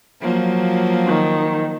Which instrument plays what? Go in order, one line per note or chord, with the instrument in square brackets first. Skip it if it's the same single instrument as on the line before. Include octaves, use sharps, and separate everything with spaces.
[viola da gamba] F3 F#3 A#3
[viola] D#3